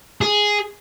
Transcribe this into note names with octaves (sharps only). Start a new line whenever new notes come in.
G#4